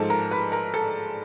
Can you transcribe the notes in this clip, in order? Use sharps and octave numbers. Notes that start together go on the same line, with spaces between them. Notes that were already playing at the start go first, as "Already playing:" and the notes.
Already playing: G#2 F3 G#3 A4 A5
A#4 A#5
B4 B5
A#4 A#5
A4 A5